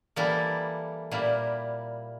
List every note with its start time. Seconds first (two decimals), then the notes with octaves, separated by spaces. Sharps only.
0.16 E3 G3 A#3 E4 A4
1.11 A#2 G3 A#3 E4